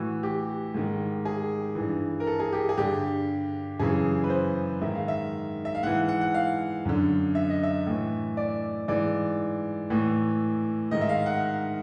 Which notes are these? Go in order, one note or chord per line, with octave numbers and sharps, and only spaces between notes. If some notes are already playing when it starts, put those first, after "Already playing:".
Already playing: A2 E3 F#4
G4
G#2 D#3
G#4
G2 E3
A#4
A4
G#4
G4
G#4
G2 D3 G4
F#2 C#3 E3 G#4
B4
C5
G#2 D#3 E5
F5
E5
E5
F5
G#2 E3 F#5
F#5
F#5
F5
F#2 D3
E5
D#5
E5
A2 E3
D5
G#2 E3 D5
A2 E3
G#2 D#3 D#5
E5
F5
F#5